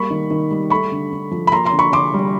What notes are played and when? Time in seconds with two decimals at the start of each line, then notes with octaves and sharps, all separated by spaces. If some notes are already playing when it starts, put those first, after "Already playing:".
Already playing: G3 A#3 B5 C#6
0.11 D#3
0.31 D#3
0.51 G3
0.70 A3 B5 C#6
0.92 D3
1.12 D3
1.31 F3
1.47 B5
1.52 A#3 A#5 C6
1.65 A#5 C6
1.72 D3
1.79 B5 C#6
1.92 D3 C6 D6
2.14 G3